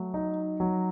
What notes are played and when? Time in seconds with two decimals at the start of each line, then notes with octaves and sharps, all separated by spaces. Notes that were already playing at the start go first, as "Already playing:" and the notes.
Already playing: F#3 A3
0.14 D#4
0.60 F#3